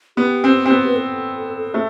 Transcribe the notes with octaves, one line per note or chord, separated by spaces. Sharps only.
B3 G4
C4
C4
B3
B4
A4
A3